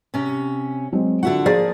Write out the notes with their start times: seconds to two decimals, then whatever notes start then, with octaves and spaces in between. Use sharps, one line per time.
0.14 C3 C#4
0.92 F#3 G#3 C4
1.23 D3 F4 F#4 E5 F#5
1.46 F3 A#3 G#4 D5 A6